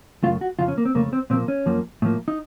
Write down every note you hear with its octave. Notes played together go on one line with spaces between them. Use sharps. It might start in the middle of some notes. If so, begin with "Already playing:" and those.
F#2 C#3 A3 F4
F#4
F2 C#3 F3 F4
C#4
A#3
C4
F2 C#3 A3 A#3
C4
A#2 F3 A#3 C4
C#4
F#2 F3 A#3
A2 F3 A#3
D#4